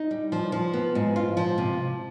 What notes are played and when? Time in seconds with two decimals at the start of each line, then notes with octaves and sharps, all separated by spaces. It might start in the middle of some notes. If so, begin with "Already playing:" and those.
Already playing: D#4
0.11 G3
0.32 F3
0.52 F3
0.73 B3
0.95 G#2
1.16 F4
1.37 F3
1.58 C3